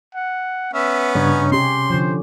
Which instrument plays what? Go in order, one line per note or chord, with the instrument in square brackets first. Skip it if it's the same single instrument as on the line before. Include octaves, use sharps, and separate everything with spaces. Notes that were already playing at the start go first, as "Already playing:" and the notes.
[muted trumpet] F#5
[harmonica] B3 C#4 [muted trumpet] E5
[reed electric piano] G2 C#3 D4 [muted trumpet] D#4 [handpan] C#5
[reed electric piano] C3 [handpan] C#4 G4 [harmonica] C6
[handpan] D3 F3 [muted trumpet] C5